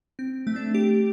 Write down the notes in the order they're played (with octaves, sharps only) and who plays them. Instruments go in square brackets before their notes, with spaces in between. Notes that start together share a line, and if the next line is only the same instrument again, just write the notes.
[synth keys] C4
A3
D4
G4